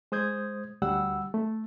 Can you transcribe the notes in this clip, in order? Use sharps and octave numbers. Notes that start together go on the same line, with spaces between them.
G#3 C5 D#6 G6 G#6
D2 G3 F#5 E6
A3